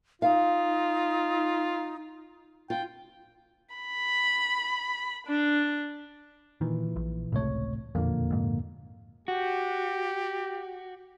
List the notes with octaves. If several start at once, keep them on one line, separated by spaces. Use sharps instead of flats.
D#4 F4 F5
F4 G5
B5
D4
A#2 D#3 E3
A#1
G#1 C#2 A2 C3 A3 C#5
E1 F2 A#2 D3 A#3
F2 G#2
F#4 G4